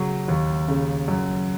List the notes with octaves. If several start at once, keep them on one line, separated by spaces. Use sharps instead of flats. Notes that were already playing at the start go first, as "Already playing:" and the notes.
Already playing: C#3 F#3
D#2
C#3
F#2